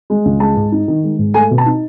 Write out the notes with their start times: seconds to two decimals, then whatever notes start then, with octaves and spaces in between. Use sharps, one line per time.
0.10 G#3
0.25 C#2
0.40 G#3 A5
0.56 G#2
0.72 D#4
0.88 D#3
1.03 G#3
1.18 G#2
1.34 A3 G#5
1.51 B2
1.58 A5
1.66 D#4